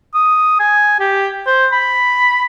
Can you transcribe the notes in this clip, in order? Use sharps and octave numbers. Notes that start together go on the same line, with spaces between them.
D#6
G#5
G4
C5
B5